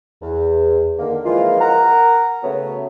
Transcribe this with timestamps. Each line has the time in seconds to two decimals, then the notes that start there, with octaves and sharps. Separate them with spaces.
0.22 E2
0.98 D3 D#3 A#3
1.25 E3 F3 G#3 A#3 D#4 F4
1.61 A#4 F#5 A#5
2.43 C#3 A3 B3 F#4 C#5